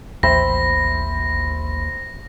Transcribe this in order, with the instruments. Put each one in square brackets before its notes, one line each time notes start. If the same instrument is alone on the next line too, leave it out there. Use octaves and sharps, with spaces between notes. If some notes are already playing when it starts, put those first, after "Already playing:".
[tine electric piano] A1 B5 [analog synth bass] D#2 [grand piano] C5 E5 G5 [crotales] A#6